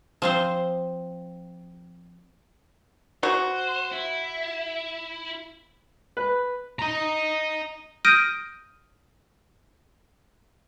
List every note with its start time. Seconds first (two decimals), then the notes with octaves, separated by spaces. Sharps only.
0.22 F3 C4 C5
3.23 F#4 C5
3.92 E4
6.17 B4
6.79 D#5 A#5
8.05 D#6 F6 G6 A#6 D7 D#7